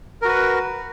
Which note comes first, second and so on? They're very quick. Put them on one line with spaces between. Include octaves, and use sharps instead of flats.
A#4 F#4 B4